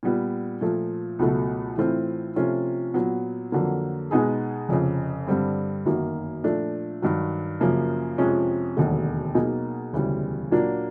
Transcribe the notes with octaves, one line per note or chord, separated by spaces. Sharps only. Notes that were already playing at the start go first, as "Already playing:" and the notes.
A#2 G3 B3
A#2 F3 A3
C#2 B2 F#3 A3
A2 E3 A3 C4 F4
C3 F3 A3 C#4 F4
A#2 F#3 B3
F2 D3 F#3 A#3
B2 G#3 B3 D#4 G#4
F1 F2 C#3
G2 D3 G3 C4
G1 F#2 D#3 F#3 A#3
A#2 F3 A3 D4
G2 D#3 F#3
F#2 C#3 F3 A#3
F2 C3 F3 G#3 C#4
E1 D#2 D3 F#3 A3
B2 F#3 A#3 D#4 G#4
E1 D2 C#3 E3 G3
A#2 F#3 A#3 D4